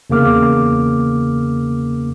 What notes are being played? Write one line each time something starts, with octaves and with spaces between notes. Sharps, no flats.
E2 C#3 A#3 D6 F6